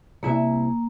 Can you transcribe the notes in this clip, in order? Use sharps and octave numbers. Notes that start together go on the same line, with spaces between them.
C2 A#3 E4 E5